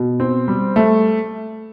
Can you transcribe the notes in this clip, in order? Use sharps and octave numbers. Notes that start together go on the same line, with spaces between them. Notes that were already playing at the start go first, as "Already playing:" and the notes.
Already playing: B2
C4
G3
A3